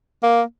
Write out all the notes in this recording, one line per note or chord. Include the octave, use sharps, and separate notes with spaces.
A#3